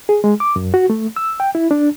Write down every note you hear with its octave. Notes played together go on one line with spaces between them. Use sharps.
G#4
G#3
D6
F#2
F#4
A3
E6
G5
E4
D4